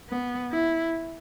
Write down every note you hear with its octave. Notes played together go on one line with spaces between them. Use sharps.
B3
E4